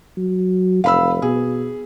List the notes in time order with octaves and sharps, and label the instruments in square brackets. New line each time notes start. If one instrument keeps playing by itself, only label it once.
[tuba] F#3
[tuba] F1 [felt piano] F5 B5 E6
[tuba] B2 [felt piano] G#4